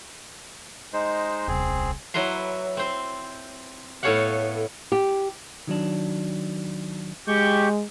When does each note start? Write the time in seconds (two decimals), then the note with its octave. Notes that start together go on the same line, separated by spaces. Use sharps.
0.93 G#3 D#4 C5
1.48 D#1 C2 C4 G#4
2.14 F#3 E4 B4 A#5 C6
2.77 C4 C5
4.03 A2 B3 A4 C#5 F5 F#5
4.92 G4
5.67 D#3 F#3 D4
7.28 G#3 G4 C#6 G6